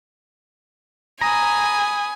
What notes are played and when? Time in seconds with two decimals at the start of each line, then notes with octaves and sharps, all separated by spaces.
1.21 G#5 A#5 B5 D#6